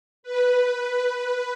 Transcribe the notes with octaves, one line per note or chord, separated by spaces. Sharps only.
B4